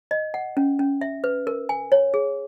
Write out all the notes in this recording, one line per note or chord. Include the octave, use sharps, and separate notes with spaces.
D#5
F#5
C#4
C#4
E5
B4
A#4
G#5
C#5
G#4